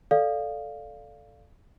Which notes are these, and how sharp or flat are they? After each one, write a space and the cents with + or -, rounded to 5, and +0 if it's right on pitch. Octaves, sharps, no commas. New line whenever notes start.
A4 +0 D5 +0 F5 +0